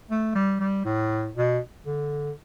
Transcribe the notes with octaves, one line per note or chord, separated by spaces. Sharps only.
A3
G3
G3
A2
B2
D3